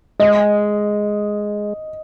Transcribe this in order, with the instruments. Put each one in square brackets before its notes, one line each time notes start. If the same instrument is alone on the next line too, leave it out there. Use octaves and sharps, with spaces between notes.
[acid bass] G#3 [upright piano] D#5